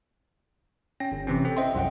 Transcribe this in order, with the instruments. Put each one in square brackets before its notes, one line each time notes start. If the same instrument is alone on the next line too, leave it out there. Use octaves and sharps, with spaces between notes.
[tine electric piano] C#4 G5 A#6
G1
C3 E3 C4 C#4
C4 A4
C5 D#5 E5 G5 C6
C2 F#2 F#5 G5